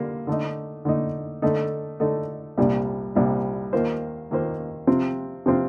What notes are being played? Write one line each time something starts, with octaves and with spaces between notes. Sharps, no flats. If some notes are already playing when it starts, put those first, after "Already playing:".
Already playing: D3 G3 A#3 F4
D3 A3 D#4
D3 A3 D#4
D3 A3 D#4 A4
D3 A3 D#4 A4
C2 A#2 G3 D4
C2 A#2 G3 D4
D#2 D#3 A#3 F4 C5
D#2 D#3 A#3 F4 C5
C3 F3 C4 F4
C3 F3 C4 F4